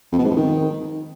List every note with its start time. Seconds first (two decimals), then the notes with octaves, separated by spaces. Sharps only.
0.12 F2
0.18 B2
0.24 G#2
0.30 F2
0.36 D#3